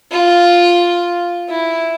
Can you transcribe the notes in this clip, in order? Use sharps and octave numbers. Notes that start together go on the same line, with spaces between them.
F4
E4